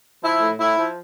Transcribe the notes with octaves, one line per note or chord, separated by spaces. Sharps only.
F3 E4
A2
A2 E4
F3